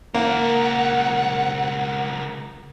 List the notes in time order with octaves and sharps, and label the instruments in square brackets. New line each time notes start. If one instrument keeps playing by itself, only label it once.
[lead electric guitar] C#2 A#4 [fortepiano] A#3 [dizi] F#5